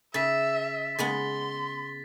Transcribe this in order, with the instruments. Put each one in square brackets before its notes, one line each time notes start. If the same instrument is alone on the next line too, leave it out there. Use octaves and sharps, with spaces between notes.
[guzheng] C#3 [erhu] E5 [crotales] A6 B6
[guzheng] C#3 G#3 B3 [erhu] C6 [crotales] A6